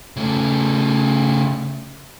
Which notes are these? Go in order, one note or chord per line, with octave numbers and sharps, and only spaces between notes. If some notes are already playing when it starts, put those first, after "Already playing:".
C#3 A3